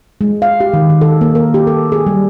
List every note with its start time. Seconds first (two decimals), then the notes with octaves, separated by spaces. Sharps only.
0.21 G#3
0.42 F5
0.60 G4
0.74 D#3
0.90 D#3
1.01 A4
1.21 A#3
1.35 A#4
1.54 G4
1.67 A4
1.92 G#4
2.07 G3